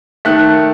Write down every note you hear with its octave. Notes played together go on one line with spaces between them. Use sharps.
D#3 A3 F#6